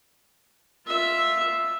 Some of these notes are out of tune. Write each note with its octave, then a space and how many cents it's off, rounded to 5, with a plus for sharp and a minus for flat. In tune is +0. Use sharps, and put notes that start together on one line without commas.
F4 +0 E5 +0